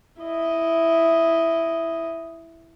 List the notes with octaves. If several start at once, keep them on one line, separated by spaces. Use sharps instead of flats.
E4 D#5